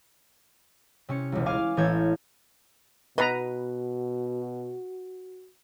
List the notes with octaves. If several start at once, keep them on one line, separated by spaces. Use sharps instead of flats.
C3 C#4 C#7
E1 C#2
F5 G#5 D6 F6
A1 E3 A4 C#5 G6 G#6
B2 B3 D#4 F#4 B4 D#5 A#5